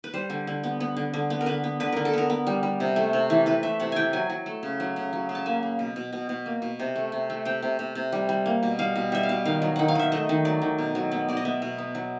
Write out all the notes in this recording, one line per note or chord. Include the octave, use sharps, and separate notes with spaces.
B4
G3 C5
D3
D3
B3
B3
D3
D3
B3
A#4
D3 B4
B3
D3 B4
D3 A#4
A4
B3 A#4
B3
G3
G3
C3
A3
C3
E3
E3 B4
A3 E5
C3 F#5
E3 G5 G#5
F#3 G#5
F#3
A3
C#3
F#3
C#3
F#3
C#3
A5
A#3 G#5
A#3
B2
B2
B2
B2
A#3
B2
C3
A3
C3
A3
C3 G5
C3
C3
C3
G3
G3
A#3
B2
G3 F5
B2
G3 E5
F5
B2
D#3 F5
F#3
D#3 F#5
F5
D#3 E5
A3 D#5
D#3
F#3 D5
D#3
B2
F#3
B3
B2 D5
D#5
B3 E5
B2
B3
F#3